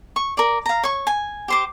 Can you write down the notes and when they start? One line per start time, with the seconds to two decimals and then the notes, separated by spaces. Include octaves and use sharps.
0.16 C#6
0.37 A#4 D5
0.66 F5 A#5
0.83 C#5 C#6
1.07 G#5
1.48 G4 C5 D6